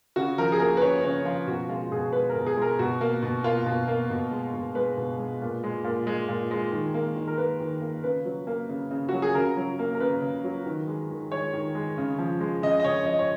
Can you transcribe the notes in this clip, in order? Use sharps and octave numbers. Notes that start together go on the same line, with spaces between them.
C#3 F#4
F3 A#4
G#4
A#3 A#4
B4
C#3 C#5
C#3 C#5
F3 F4
B2 F#4
G#3 F4
B2 G#4
G#3 B4
A#4
B2
G#4
G#3 A#4
B2 F#4
A#3
B2
A#3 F4
B2
A#3
B2
G#3
B2
G#3 B4
B2
G#3
A#2
G#3
A#2
G#3
A#2
G#3
D#3
A#3
D#3
A#4
A#3 B4
D#3
A#3
C#3 B4
F#3
A#3
C#3
C#3
F#3 F#4
G#4
C#3 A#4
F#3
A#3
A#4
C#3 B4
C#3
F#3
D#3
G#3
D#3
G#3 C#5
D#3
G#3
C#3
F3
G#3
C#3 D#5
D#5
C#3 C#5
F3 D#5
C#5